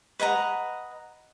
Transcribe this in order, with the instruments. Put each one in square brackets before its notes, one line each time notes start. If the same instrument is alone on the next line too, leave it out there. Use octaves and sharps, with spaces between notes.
[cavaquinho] B4 D#5 F#5 A#5